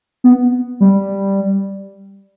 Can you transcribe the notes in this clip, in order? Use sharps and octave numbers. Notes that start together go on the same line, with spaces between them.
B3
G3